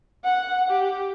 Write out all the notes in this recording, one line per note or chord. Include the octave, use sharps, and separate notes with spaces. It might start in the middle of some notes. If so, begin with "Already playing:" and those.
F#5
G4